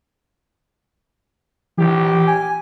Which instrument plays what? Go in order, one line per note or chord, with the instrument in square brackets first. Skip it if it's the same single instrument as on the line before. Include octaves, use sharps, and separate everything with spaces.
[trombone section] A#1 G4 [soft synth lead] E3
[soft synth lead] G#5